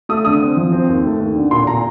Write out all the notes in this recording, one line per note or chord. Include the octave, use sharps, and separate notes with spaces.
A3 D#6
D3 D#6
C4
F3
C4
D#2
A3
D#2
D3
A#2 C6
A#2 A#5